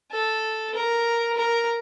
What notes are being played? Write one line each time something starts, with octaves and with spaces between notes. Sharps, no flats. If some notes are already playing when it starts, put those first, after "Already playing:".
A4
A#4
A#4